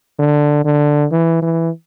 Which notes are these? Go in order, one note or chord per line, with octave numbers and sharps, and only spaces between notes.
D3
D3
E3
E3